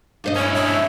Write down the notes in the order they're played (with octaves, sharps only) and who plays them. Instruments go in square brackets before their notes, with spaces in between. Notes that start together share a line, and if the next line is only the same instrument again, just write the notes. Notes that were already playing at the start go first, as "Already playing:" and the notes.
[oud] G2 C5 D#5
[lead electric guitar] C#4 E4 [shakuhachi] C#5
[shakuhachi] E5